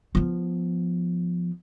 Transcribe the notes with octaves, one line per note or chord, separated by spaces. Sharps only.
F3 B3